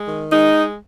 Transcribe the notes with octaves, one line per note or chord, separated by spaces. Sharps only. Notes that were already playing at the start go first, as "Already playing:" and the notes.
Already playing: G#3
D#3
G#3 D#4